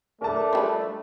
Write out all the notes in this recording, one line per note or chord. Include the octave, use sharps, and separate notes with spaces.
A3 D4 A#4 A5
F3 G3 B4